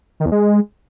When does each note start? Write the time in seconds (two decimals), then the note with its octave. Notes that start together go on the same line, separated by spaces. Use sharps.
0.20 D#3
0.26 E2
0.32 G#3